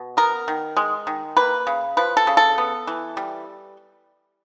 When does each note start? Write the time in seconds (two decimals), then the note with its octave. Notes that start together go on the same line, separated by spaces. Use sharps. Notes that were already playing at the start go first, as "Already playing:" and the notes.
Already playing: B2
0.17 B3 A#4
0.48 D#3
0.77 G#3
1.07 D#3
1.37 A#3 B4
1.67 C#3
1.97 F3 B4
2.17 A4
2.27 C#3
2.37 A4
2.58 B3
2.87 E3
3.17 G3